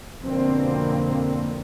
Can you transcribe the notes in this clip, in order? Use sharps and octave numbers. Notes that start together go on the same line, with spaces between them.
F2 B2 D3 A#3 C4